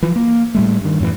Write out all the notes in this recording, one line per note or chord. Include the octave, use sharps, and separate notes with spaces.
E3 F3
A#3
A2 G3 A3
G2 D#3
F#2 A2 C3 E3